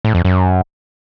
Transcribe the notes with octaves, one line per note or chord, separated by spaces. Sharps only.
A2
F2
F#2